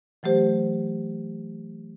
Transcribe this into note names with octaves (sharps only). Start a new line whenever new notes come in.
E3 F#3 A3 G4 C5